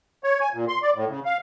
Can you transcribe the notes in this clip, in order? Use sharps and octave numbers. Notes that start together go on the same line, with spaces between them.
C#5
G#5
A#2
C6
D5
A2
C#3
F5